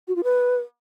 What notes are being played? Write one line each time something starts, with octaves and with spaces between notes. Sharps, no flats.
F#4
F4
B4